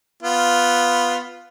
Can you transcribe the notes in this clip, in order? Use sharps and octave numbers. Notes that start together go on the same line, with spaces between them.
B3 F4